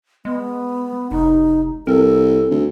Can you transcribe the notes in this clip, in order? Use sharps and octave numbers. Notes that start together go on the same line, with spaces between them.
G#3 B3
F1 D#4
C2 A4 A#4
D2